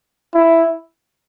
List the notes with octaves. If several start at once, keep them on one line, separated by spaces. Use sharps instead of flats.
E4